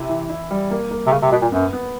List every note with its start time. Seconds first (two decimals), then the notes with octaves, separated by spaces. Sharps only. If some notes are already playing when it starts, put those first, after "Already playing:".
Already playing: C3 E4
0.09 E3
0.30 E4
0.51 G3
0.71 A#3
0.91 A#3
1.07 C3
1.12 C#3 A#3
1.22 C3
1.31 B2 A#3
1.42 A#2
1.52 F#2 B3
1.73 B3